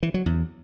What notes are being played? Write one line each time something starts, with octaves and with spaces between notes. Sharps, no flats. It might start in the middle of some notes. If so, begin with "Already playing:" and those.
E3
F#3
E2